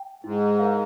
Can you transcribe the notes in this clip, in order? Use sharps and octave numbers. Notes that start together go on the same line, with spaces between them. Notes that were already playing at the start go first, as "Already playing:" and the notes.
Already playing: G5
G#2 E4
A#4 F5